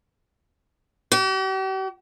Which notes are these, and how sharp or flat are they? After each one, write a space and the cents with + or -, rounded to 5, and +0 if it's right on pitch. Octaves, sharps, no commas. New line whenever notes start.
G4 -45